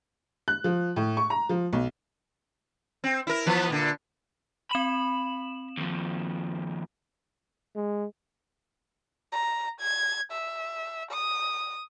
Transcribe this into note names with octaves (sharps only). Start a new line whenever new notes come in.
F#6
F3
A2
C#6
A#5
F3
B1
C4
E4 A#4
E3 F3 B3
A#2 D3
C4 B5 E7 F#7
D#2 F3
G#3
A#5
G#6
E5
D#6